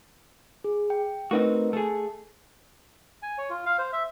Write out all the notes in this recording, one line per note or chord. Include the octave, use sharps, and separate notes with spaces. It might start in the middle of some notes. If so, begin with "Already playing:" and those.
G#4
G5
A3 C4 D#4 F#4 A#4 B4
A3 G#4 A5
G#5
C#5
F4
F5
C5
E5